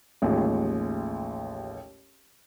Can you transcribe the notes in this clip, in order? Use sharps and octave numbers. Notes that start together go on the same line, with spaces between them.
A1 D#2 F3 G#3